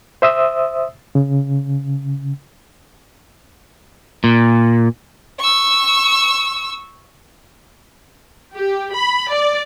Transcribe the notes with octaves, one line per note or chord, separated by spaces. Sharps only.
C5 E5 D#6 E6
C#3
A#2
C#6 E6
G4
B5
D5